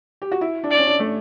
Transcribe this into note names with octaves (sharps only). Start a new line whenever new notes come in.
G4
F#4
E4
D4
D5
C#4
D4
A3